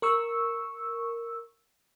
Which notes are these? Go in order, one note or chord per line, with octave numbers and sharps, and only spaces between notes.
A#4 C#6 E6